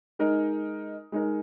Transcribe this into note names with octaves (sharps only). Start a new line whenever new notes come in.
G#3 D#4 A#4
G#3 D#4 A#4